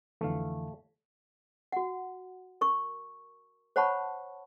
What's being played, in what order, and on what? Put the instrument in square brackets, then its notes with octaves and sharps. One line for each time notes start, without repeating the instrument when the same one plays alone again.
[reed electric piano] F2 D3 E3 [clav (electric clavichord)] A3 F5
[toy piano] F#4 F#5
A#4 C#6
C5 C#5 F#5 A5 B5 C#6